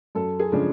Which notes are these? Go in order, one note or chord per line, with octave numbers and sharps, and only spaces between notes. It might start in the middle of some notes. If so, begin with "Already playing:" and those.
F#2 A4
G#4
C#3 F3 G#3 D4